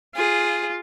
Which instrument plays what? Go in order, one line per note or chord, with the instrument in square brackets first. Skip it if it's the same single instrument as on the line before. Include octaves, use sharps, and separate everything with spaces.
[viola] F4 [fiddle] G#4